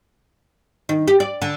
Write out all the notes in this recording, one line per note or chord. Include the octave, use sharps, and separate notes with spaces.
D#3
G4
D5
D3